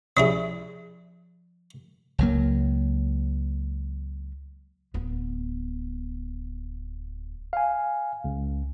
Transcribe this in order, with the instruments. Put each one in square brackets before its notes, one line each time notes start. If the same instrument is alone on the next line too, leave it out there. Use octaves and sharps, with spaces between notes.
[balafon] F3 [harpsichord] C#4 E4 G#4
[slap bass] C#2 F#3 A#3
[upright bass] D1 B3
[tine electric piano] F5 G#5
C#2